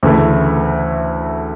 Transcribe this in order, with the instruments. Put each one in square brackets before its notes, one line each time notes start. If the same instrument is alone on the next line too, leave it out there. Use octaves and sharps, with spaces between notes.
[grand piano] D2 C#3 E3 A3 E4